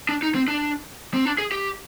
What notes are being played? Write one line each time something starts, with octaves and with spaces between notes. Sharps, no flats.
D4
D#4
C4
D4
C4
D4
G#4
G4